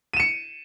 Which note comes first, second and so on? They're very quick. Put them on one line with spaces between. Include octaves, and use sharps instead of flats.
D#7 E7 C#7